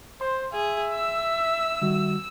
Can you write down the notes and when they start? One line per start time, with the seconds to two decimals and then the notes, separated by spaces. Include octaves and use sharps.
0.21 C5 C6
0.53 G#4 E5
0.94 E6
1.82 D#3 G3 F#4